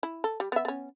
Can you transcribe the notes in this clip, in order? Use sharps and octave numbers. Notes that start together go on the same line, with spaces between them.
E4
A4
G3
B3 E5
B3 C#4